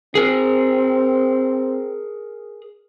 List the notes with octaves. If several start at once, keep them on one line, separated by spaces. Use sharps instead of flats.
C4 G#4 A#4